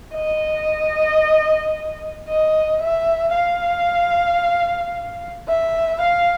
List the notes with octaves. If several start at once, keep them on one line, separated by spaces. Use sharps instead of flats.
D#5
D#5
E5
F5
E5
F5